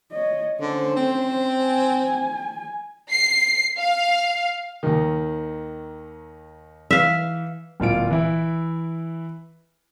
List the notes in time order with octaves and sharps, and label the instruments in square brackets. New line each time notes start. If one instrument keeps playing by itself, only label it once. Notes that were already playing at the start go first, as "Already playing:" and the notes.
[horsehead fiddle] C#5 D#5
[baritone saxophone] D3 [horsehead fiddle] C#4 C5
[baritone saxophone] C4
[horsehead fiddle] G#5
[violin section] C7
F5
[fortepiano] D#2 D#3
[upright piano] E3 [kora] E5 F5
[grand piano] D1 A#2 F4 D7
E3 E4